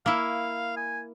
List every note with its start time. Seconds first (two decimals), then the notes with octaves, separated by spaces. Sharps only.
0.06 A#3 E4 F5
0.76 G#5